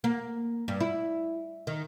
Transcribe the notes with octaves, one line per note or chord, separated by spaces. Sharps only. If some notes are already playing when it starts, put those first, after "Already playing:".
A#3
G2
E4
D#3